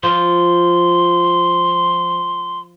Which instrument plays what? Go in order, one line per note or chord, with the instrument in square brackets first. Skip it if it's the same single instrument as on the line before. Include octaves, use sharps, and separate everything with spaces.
[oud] F3 [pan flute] C6